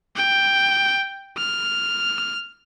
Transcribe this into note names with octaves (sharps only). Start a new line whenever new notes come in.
G5
F6